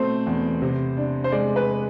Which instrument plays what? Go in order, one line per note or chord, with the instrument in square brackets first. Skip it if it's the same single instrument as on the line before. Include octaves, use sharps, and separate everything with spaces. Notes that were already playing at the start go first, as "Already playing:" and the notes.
Already playing: [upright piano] B2 A3 C4 [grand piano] C5
[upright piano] E2
C3
D4
[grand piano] C5
[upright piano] G#3 [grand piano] D5
[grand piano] B4